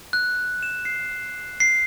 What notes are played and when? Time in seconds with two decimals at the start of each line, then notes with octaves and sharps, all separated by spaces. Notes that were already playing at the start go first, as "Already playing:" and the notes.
0.13 F#6
0.63 E7
0.85 C7
1.60 C7